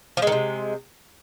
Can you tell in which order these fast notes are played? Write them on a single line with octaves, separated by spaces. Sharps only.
F3 G#3 D#3 C3